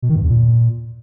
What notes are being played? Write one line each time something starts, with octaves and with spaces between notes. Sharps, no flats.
B2
D#3
G2
E2
A#2